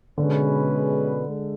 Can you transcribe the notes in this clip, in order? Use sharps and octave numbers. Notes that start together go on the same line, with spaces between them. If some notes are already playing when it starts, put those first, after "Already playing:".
B2 D3 G#3 C#4 G#4 B4
G#3